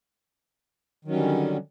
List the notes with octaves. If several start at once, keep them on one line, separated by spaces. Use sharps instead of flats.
D3 D#3 F#3 G3 C#4